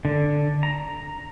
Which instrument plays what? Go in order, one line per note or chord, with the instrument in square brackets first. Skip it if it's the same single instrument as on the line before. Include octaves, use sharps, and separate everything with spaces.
[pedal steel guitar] D3
A#5